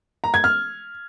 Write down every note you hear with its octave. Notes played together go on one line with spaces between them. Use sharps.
A#5
G#6
F6